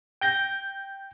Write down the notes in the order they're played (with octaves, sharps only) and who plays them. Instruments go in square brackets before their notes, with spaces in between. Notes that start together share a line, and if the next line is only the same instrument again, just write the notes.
[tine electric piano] G5 G6 A#6